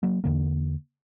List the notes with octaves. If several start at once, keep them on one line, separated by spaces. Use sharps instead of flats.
F#3 A#3
E2 D3 A#3